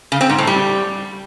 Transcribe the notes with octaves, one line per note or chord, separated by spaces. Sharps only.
C#3
C4
G#2
A2
G3